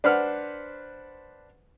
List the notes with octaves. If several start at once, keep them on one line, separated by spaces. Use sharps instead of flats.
D4 B4 C5 F#5 F6